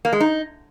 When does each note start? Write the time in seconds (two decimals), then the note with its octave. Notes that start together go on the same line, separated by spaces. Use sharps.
0.05 A#3
0.13 G#3
0.20 D#4